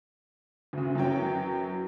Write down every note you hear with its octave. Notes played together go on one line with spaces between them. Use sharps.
D2 C#3
F#2 E3 F#3 G5